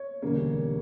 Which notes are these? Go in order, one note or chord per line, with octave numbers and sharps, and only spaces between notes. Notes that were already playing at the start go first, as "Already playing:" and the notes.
Already playing: C#5
E1 D2 C#3 G3 A#3